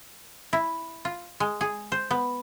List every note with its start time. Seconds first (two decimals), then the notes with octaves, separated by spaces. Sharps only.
0.53 E4
1.05 F4
1.40 G#3
1.61 G#4
1.92 C5
2.11 B3